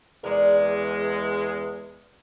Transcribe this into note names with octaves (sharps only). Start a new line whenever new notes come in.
E2 G#3 A#4 D5